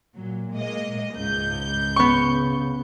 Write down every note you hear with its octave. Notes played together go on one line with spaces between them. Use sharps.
A#2 F#3
G#3 A#3 D#5
C#2 G#2 G6
C#3 B3 C#6